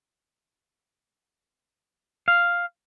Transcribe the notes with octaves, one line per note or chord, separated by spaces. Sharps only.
F5